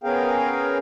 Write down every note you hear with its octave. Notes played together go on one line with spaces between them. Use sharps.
B3 C#4 G#4 A#4 F5 G5